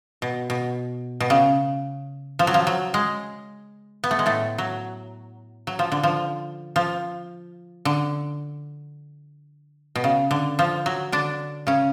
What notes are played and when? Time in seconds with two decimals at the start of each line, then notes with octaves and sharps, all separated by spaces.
0.22 B2
0.50 B2
1.20 B2
1.30 C#3
2.39 F3
2.47 F#3
2.54 F3
2.67 F#3
2.94 G#3
4.04 B3
4.11 A3
4.19 G#3
4.26 A2 A3
4.58 F#3
5.67 F#3
5.79 F3
5.92 D3
6.03 F3
6.76 F3
7.85 D3
9.95 B2
10.04 C#3
10.31 D3
10.59 F3
10.86 F#3
11.12 D3 D4
11.67 C#3 C#4